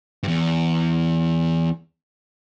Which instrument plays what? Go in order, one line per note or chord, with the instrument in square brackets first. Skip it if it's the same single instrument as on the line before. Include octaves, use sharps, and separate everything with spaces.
[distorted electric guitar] E2 G2